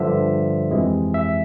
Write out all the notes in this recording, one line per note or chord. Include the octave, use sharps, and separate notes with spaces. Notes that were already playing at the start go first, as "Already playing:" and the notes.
Already playing: G2 D3 F3 E5
F2 C3 E3 G#3
E5